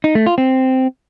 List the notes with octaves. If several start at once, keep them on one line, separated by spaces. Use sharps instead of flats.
D#4
A3
F4
C4